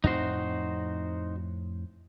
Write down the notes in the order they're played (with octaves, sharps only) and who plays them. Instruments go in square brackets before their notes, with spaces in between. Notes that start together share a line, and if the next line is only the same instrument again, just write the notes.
[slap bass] F2 A2 C4 [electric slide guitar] D#4 F#4 C5